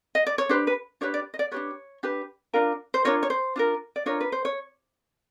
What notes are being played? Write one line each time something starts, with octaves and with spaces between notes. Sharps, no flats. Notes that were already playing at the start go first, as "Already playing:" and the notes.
D#5
D5
C#5
D4 G4 B4 C5
B4
D4 G4 B4 C#5
D5
D#5
D5
D4 G4 B4 C#5
D4 G4 B4
D4 F4 A#4
C5
D4 F4 A#4 C#5
C#5
C5
D4 F4 A#4
D5
D4 F4 A#4 C#5
B4
C5
C#5